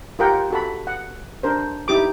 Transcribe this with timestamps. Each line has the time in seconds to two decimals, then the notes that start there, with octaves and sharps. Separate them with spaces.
0.19 F4 G4 A#4 F#5 G5
0.50 F#4 A4 B5
0.87 F#5
1.43 D4 A#4 C5
1.88 D#4 E4 G4 D6